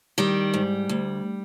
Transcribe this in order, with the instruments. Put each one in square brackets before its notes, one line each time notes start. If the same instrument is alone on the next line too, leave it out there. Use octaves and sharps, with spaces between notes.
[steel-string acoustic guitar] D#3 G3
G#2
D2